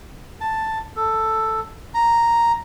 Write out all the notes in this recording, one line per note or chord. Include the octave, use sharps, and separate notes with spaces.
A5
A4
A#5